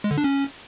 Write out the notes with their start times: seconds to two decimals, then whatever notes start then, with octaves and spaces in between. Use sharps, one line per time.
0.04 G#3
0.11 D3
0.18 D4
0.24 C#4